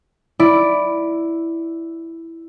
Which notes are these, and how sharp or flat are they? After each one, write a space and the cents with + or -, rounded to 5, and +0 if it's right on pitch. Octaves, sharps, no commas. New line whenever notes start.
E4 +0 D5 +0